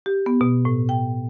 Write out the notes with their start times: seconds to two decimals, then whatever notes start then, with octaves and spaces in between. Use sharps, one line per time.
0.06 G4
0.26 B3
0.41 B2
0.65 A2
0.89 G5